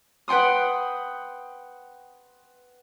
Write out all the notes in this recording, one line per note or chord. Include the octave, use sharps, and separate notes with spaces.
B4 F#5 G5 C6 D#6